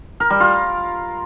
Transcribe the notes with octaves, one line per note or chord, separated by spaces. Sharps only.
A#4
G3
F4